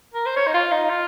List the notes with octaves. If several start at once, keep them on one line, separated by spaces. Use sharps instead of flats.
A#4
C5
C#5
D#4
F4
D#4
F4